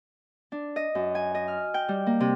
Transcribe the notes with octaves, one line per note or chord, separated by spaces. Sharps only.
D4
D#5
F#2
G#5
D#5
F6
G5
G3
A#3
C3